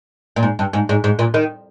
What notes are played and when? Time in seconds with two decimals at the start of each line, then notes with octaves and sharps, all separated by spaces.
0.36 A#2
0.43 G#2
0.59 G2
0.73 G#2
0.89 G#2
1.04 G#2
1.19 A#2
1.34 D#3